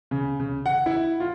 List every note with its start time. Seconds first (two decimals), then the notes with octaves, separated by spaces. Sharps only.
0.11 C#3
0.40 C#3
0.66 F#5
0.86 E4
1.20 F4